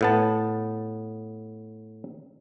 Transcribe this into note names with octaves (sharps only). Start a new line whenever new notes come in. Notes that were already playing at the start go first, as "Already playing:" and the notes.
A2 B3 A5